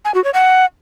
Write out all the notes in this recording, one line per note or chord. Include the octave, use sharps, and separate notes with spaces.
G#5
F#4
C#5
F#5